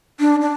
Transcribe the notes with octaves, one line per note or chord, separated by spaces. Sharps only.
D4
D4